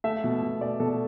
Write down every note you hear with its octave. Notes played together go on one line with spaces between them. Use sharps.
A3 E5
B2
B2
A3 D5
B2 A4